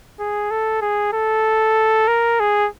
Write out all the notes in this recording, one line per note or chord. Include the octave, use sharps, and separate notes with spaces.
G#4
A4
G#4
A4
A#4
G#4